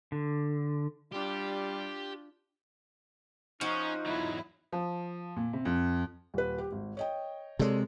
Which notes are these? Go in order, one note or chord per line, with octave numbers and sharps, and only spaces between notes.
D3
G3 D4 F4 G4
F3 C#4 D#4 F#4
E2 F#3 E4
F3
A#2
C3
F2
D#1 B4
G4
G#1
C#5 D#5 G5
C3 G#3 A4 C#5 D5